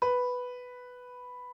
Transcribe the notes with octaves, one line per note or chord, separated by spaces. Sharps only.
B4